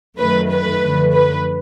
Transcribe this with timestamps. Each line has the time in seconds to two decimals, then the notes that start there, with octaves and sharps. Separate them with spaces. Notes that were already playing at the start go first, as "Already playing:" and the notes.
0.18 F#2 D#3 F#3 A3 B4
0.50 B4
0.81 F#2 D3 F3 A3
1.12 B4